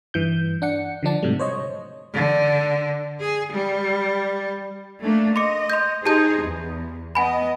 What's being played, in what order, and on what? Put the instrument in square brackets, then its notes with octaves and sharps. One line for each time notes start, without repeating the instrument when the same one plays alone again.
[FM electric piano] G2 E3 G6
D4 F#5 C#7
D3 F3 D4 A5
G#2 C3 F#3 G3 A3
C5 C#5 D#5
[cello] D3
G#4
G3
[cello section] A3 A#3 D4
[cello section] D#5 [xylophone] C6 D6 C#7
[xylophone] C6 G6
[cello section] D#4 G#4 C5 [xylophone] G4 A5 G6
[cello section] E2
[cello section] B3 D#5 [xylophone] F#5 G#5 B5